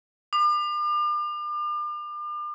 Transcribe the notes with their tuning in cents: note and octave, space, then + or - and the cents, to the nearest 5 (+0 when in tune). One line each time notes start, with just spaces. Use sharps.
D6 +40